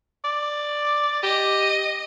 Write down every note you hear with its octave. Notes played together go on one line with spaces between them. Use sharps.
D5
G4 D#5